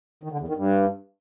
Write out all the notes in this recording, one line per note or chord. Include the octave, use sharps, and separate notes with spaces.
D#3
D3
E2
D#3
G2